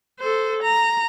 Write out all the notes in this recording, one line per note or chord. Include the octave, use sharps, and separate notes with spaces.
A4 C5
A#5